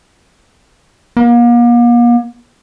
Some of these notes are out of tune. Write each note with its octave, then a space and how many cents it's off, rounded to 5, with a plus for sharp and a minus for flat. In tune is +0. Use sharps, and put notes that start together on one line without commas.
A#3 +40